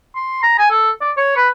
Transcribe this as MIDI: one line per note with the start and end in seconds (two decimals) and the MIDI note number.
0.16 0.40 84
0.43 0.54 82
0.59 0.67 80
0.71 0.90 69
1.01 1.11 74
1.17 1.36 73
1.36 1.49 71